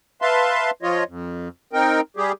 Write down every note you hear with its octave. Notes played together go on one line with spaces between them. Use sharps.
B4 E5 F5 A5 C6
F3 F4 C#5 D#5
F2
C4 D#4 A#4 G5
G3 G4 G#4